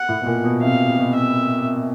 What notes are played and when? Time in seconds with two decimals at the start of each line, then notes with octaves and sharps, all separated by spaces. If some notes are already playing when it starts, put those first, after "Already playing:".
Already playing: F#5
0.09 A2
0.22 B2
0.26 A#2
0.44 B2
0.62 C3 F5
0.98 B2
1.16 E5